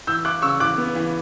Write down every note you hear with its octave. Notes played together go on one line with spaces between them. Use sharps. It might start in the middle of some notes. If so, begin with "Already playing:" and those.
E3 E6 G6
E4 D6 F#6
C#3 C#6 E6
E3 D6 F#6
B3
E3